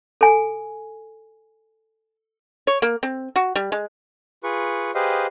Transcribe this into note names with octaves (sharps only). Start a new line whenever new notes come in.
A4 G#5
C#5
A#3
C4
F#4
G3
G#3
F4 G#4 B4 C#6
G4 G#4 B4 C5 D#5 F5